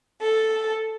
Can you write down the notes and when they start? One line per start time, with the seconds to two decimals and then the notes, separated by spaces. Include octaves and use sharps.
0.22 A4